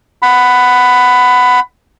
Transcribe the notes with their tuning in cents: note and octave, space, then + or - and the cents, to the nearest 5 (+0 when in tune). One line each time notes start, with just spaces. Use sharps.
F#5 +0 B5 +15